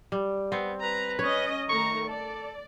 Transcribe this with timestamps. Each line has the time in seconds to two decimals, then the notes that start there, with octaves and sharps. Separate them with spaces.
0.12 G3
0.52 B3 C4
0.83 B4 A#5
1.19 C#4 C#5 D#5
1.69 D#3 A3 A#5 C#6
2.08 A4 D5